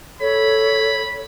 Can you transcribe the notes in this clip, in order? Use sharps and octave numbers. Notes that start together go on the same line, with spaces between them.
A4 C#5 B5